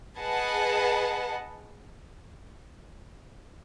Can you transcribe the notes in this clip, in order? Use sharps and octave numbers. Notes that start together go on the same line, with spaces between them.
G#4 B4 D#5 F#5 A5